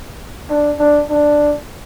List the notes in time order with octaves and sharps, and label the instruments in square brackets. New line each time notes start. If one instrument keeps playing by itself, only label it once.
[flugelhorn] D4
D4
D4